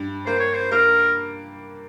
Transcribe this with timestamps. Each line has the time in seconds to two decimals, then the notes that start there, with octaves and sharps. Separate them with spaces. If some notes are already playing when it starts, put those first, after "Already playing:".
Already playing: G2
0.26 A#3 C5
0.40 C#5
0.54 C5
0.71 A#3 A#4